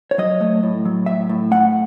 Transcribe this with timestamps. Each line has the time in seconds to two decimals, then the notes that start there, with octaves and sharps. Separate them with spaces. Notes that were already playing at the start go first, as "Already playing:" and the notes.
0.11 C#5
0.18 F#3 D#5
0.41 A3
0.63 A2
0.85 F#3
1.06 A2 E5
1.29 A2
1.51 A3 F#5